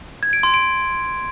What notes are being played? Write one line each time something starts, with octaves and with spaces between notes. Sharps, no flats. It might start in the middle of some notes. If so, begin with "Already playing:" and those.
G#6
D7
C6
D7